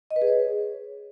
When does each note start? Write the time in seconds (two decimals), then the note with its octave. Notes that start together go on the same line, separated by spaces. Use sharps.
0.11 D#5
0.16 B4
0.22 G#4
0.27 C#5